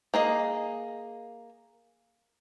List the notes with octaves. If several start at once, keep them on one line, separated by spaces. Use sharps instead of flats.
A#3 G#4 D#5